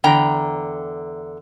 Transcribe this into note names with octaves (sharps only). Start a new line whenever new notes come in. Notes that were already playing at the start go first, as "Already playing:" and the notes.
E2 D3 G5 A#5